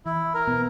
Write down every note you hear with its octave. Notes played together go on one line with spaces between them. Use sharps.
E3 E4
A#4
B2 B3